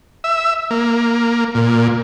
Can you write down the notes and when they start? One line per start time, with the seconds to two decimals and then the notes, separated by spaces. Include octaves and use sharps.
0.24 E5
0.71 A#3
1.55 A#2